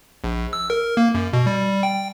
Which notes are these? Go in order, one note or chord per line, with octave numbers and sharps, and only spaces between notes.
A#1
E6
A#4
A#3
F#2
B2
G3
G5